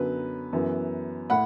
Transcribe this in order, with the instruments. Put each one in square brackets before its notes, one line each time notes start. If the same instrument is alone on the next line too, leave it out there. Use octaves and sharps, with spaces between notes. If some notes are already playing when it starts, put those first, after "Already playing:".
Already playing: [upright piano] F#2 D3 F#3 B3 B4
F#2 E3 B3
A2 F#5 B5